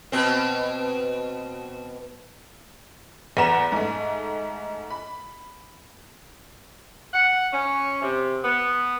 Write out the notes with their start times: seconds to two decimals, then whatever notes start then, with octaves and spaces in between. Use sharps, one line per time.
0.12 B2 C4
3.37 E2 B4 F#5 A#5 B6 E7
3.72 G#2 A3
4.91 B5
7.13 F#5
7.53 C#4
8.02 C3
8.43 B3